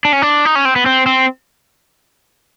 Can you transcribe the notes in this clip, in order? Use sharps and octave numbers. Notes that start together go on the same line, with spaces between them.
D4
C#4
D4
D#4
C#4
C4
B3
C4
C4